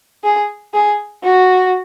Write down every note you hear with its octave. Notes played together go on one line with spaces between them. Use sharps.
G#4
G#4
F#4